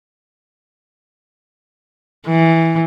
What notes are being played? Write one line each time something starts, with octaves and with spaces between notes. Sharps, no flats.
E3